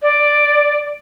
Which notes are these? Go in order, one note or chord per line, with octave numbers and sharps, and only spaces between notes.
D5